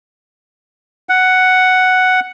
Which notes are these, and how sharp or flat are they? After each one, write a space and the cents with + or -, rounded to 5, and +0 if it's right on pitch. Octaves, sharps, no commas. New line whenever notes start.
F#5 +5